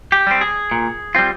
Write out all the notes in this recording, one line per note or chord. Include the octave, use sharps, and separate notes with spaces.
G4
G3 C4
G#4
A#2
G3 C4 F4